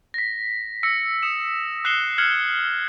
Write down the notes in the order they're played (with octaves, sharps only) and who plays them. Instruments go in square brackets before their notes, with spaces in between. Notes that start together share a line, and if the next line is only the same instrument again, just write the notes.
[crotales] A#6 B6
E6 A#6 C#7
D#6 C#7 E7
D#6 F#6 C7 C#7 E7 G7
F6 F#6 G#6 C#7 F#7 G7